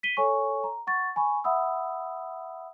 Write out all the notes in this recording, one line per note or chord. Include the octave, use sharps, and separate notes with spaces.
B6 D#7 G7
A4 C#5 G#5 C#6
A#5
F#5 C#6 A6
G#5 B5 C#6
E5 F#5 B5 D#6 E6